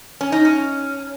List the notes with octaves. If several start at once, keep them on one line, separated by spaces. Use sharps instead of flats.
C#4
D#4
C#4